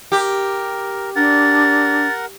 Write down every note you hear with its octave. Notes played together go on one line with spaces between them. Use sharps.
G4 A#4
D4 A#4 F#5 A6